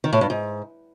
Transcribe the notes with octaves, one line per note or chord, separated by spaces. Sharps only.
D#3
A2
G2
G#2